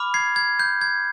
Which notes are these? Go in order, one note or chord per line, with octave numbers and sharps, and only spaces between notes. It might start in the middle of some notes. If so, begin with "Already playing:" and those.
Already playing: B5 D6 F6
G#6 C7
G#6
G6
G#6